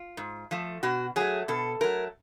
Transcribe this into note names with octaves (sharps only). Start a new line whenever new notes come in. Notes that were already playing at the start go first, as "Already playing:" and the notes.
Already playing: F4
G#2
F3 A3
B2 F#4
F#3 A3 G#4
B2 A4
F#3 A3 A#4